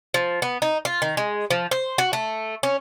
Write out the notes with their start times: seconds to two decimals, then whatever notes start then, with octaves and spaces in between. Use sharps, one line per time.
0.14 F3
0.42 B3
0.62 D#4
0.85 F4
1.02 D#3
1.17 G#3
1.51 F3
1.71 C5
1.98 F#4
2.13 A3
2.63 C#4